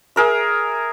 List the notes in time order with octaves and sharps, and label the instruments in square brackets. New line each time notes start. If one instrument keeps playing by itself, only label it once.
[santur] G#4 A#4 E5